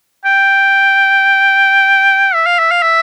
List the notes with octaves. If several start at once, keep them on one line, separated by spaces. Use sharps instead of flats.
G5
E5
F5
E5
F5
E5